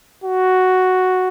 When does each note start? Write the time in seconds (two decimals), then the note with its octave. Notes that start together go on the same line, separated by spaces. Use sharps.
0.24 F#4